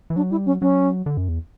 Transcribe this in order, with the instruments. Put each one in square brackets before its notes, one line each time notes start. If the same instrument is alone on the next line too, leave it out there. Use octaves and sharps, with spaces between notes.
[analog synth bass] E3
[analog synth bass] F#3 [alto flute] D4
[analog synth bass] G3 [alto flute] E4
[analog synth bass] F#3 [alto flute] C#4
[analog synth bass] F#3 [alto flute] C#4
[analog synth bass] D3
F#2
E2